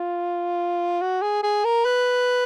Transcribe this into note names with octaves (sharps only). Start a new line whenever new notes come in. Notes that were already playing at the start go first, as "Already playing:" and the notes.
Already playing: F4
F#4
G#4
G#4
A#4
B4